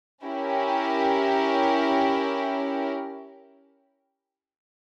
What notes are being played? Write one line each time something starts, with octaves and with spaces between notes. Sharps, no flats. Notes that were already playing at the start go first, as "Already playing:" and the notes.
C#4 E4 G4 A#4